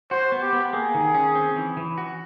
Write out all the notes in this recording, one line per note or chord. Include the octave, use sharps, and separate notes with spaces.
F#4 C5
B3
G4
B3
A#3 G#4
D#3
C#4
C4
E3
E3
F#4